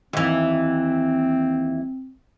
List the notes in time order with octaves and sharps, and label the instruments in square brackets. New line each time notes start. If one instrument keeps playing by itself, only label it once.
[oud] D#2 E3 [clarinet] C4